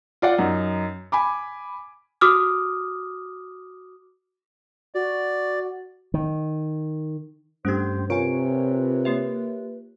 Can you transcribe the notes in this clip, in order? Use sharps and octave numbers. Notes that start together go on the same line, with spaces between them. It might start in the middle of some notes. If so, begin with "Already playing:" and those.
F4 D5 F#5
F#2 D#4
G#5 B5 D6
F#4 D6 D#6 F6
F#4 D5
D#3
G2 A3 C#4 D4 G4 C5
C3 F4 A#4 B4 C#5 G#5 D7
A#3 G4 E5